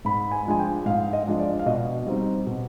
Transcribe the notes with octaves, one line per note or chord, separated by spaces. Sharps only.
G#2 B5
G#5
F3 G#3 D4 F4 G#5
G5
G#2 F5
D#5
F3 G#3 D4 F4
D5
F5
B2 D#5
G3 C4 D#4
B2